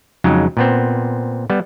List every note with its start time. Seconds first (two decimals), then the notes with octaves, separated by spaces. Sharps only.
0.24 F2 C#3 F#3 G#3 D#4
0.57 A#2 B3 C4
1.50 G3 B3